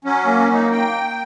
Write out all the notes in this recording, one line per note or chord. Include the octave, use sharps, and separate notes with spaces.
F#3 C#4
A#3
D#4
G5